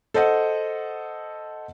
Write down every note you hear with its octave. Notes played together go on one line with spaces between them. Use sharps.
A4 C5 D#5 F#5